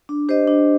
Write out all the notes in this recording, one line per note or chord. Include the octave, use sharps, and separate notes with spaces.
D4
G4 C5 D#5
D4